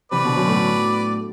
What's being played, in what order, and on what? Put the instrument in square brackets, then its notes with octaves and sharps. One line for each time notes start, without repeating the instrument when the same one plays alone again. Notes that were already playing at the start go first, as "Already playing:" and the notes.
[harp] C3 E3 [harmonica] B4 D5
[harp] B2 D3
F#2
A2